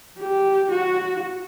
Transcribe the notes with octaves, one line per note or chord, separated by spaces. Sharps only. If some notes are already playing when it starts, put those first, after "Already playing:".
G4
F#4